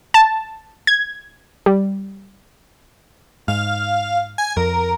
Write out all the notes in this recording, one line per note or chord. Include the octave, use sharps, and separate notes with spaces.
A5
G#6
G3
G#2 F5
G#5
F2 A#4